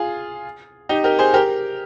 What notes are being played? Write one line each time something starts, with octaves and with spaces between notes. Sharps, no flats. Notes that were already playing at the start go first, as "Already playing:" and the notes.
Already playing: F4 G#4
D#4 G4
G4 A#4
G#4 C5
G4 A#4